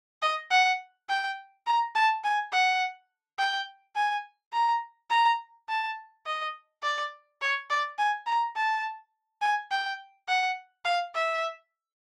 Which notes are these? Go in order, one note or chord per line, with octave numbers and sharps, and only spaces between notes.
D#5
F#5
G5
A#5
A5
G#5
F#5
G5
G#5
A#5
A#5
A5
D#5
D5
C#5
D5
G#5
A#5
A5
G#5
G5
F#5
F5
E5